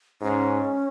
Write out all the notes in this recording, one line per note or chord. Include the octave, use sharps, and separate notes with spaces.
G#2 C#4